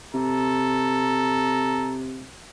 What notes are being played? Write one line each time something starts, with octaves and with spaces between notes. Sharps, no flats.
C3 A4 A#5